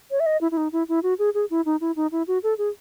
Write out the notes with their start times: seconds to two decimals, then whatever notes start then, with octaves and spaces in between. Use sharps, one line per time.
0.11 C#5
0.20 E5
0.26 D#5
0.41 E4
0.51 E4
0.57 D#4
0.72 E4
0.89 E4
1.03 F#4
1.19 G#4
1.34 G#4
1.50 E4
1.66 D#4
1.81 E4
1.96 D#4
2.12 E4
2.28 F#4
2.43 A4
2.58 G#4